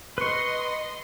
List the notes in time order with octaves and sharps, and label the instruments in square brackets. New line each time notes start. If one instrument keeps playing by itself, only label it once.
[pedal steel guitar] B4 C#6 [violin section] D#5 C6